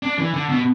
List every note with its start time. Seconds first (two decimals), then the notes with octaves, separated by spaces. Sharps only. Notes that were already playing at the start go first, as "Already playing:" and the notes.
0.03 D4
0.18 E3
0.33 D3
0.49 B2